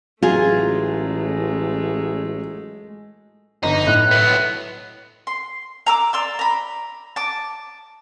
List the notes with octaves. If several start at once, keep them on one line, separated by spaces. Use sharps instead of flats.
A1 F#3 G#3 A3 F4 G#4
G1 D3 D#4
A2 F#6
F#3 B3
C6
A#5 D6 E6
D5 C6 E6
A#5 B5
A5 D6